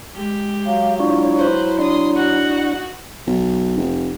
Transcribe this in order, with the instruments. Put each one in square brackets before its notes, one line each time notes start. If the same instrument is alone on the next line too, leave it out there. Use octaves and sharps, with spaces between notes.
[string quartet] G#3 G4
[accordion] F#3 [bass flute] F5
[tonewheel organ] D4 F4 C#5 [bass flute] E4
[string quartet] B4 C5
[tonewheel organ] D4 [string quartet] C6 D#6
[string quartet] D#4 F#4 F#5
[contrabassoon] B1
F1